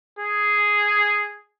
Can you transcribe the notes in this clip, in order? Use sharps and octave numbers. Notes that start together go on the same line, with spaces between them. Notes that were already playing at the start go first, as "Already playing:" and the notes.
G#4